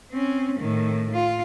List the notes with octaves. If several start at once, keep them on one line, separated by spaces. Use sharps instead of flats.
C4 C#4
A2 D#3
F4